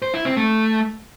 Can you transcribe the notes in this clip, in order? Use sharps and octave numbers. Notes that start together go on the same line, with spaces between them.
C5
E4
C4
A3